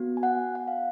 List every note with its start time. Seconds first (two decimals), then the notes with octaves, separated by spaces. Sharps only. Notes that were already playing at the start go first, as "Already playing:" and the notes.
Already playing: B3 F#4
0.17 G#5
0.23 F#5
0.55 F#5
0.67 F5